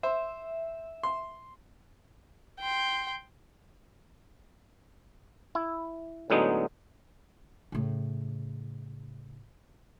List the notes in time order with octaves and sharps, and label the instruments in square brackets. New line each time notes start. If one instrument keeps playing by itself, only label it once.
[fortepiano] C5 [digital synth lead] E5
[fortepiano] C6
[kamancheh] G5 C6
[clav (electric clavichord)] E4
A2 D3 F#3 G#3 B3 D#4
[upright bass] A2 C#3